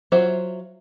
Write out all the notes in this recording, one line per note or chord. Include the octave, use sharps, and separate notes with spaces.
F#3 F4 C5 E5